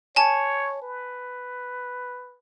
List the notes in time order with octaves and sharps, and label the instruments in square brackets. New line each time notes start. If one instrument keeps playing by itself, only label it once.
[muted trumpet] C#5 [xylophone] G#5 A5
[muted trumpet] B4